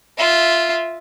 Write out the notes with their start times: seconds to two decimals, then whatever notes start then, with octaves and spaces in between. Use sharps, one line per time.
0.17 F4 E5